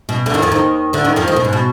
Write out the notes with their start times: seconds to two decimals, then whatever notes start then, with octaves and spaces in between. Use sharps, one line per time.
0.09 B2
0.26 D2 D3
0.34 D#2 D#3
0.42 F2 F3
0.52 D#2 D#3
0.93 D2 D3
1.04 D#2 D#3
1.16 F2 F3
1.28 D#2 D#3
1.36 B2
1.45 G#2
1.53 B2